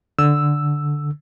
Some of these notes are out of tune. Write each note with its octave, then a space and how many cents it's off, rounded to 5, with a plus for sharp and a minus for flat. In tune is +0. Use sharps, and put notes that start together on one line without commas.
D3 +0 E6 +0